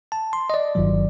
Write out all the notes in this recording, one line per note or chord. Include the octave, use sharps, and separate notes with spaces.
A5
C6
D#5
D5
G1 G2 D#3 F#3